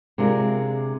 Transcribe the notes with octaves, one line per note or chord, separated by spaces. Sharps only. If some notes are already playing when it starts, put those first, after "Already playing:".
C3 G#3 D4 F4 A#4